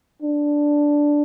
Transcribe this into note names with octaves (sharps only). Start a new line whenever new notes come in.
D4